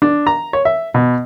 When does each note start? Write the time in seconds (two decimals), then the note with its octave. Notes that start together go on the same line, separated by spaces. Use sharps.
0.02 D4
0.27 A#5
0.53 C#5
0.65 E5
0.94 B2